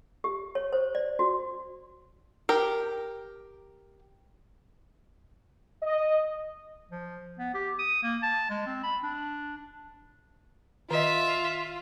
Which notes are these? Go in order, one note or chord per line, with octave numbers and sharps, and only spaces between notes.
G4
C#5
C5
D5
F#4
G4 A#4
D#5
F3
B3
G4
D#6
A#3
A5
G#3
C4
B5
D4
D#3 F4 D#5 E5